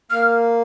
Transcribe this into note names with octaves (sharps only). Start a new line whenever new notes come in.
A#3 F6